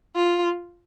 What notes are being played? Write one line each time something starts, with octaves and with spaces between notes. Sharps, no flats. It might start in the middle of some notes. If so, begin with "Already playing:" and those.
F4